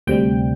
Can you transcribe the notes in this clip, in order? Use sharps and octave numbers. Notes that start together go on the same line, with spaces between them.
D2 C3 G3 G5